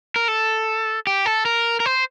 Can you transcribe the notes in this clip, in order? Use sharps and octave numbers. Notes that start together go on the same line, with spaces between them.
A#4
A4
G4
A4
A#4
A#4
C5